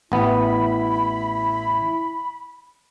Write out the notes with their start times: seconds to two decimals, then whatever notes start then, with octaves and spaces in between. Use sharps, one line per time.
0.12 A1 B3 E4 B5